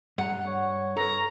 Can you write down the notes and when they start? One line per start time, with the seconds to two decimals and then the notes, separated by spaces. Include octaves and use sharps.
0.18 G2 F#5 A#5
0.47 C#5
0.97 C#4 A4 B4 A#5